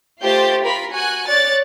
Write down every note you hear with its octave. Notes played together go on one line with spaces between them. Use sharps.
A3 F4 G4 C5 G6 A6
F4 A#4 B5 B6
F#4 G#5 F#6
C#5 D5 F#6 A6